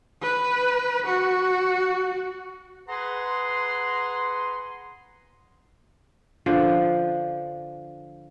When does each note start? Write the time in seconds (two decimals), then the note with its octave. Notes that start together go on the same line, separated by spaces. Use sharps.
0.22 B4
1.06 F#4
2.89 G#4 B4 F#5 G#5 A#5 C6
6.46 D3 F3 D4